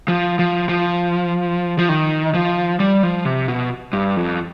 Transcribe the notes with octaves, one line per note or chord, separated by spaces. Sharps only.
F3
F3
F3
F3
D#3
F3
G3
F3
C3
B2
G2
F2